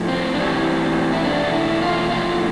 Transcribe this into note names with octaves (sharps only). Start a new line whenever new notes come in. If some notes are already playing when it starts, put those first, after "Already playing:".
Already playing: A2 F3 A3
C4
D4
A2 E3 G3 C4
E4
E2 B2 A3 D4
E4
F4
A2 F3 A3 F4